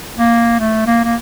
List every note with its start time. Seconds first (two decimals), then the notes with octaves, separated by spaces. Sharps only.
0.18 A#3
0.60 A3
0.87 A#3
1.04 A#3